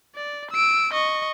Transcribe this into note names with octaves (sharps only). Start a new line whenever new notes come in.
D5
E6 D7
D#5 C#6